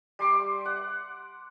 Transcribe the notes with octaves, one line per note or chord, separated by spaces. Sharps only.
G3 C6 D6
F#5